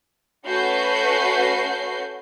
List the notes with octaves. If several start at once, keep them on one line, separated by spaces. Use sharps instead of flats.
A3 C#4 F#4 B4 G6 C7